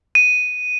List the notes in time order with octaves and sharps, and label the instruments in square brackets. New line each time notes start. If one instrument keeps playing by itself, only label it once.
[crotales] D#7